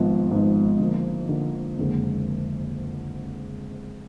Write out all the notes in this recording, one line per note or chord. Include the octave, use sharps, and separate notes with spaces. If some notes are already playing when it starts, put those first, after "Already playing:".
Already playing: G#1 G#2 F3 B3
G#1 G#2 F3 B3
D3 F3 A#3
D3 F3 A#3
F#1 F2 D3 G#3